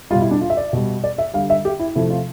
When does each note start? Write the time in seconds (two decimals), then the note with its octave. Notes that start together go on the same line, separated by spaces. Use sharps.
0.10 G3 F4
0.15 B2
0.21 E4
0.31 D4
0.41 F4
0.50 E5
0.57 D5
0.73 B2 G3
1.04 D5
1.18 E5
1.34 D3 G3 F5
1.50 E5
1.65 G4
1.79 E4
1.95 C3 F3 A3 E4
2.10 F4